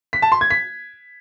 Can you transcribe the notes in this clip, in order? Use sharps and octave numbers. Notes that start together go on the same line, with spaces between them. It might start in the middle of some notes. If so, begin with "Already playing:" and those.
B6
A5
C6
G#6
B6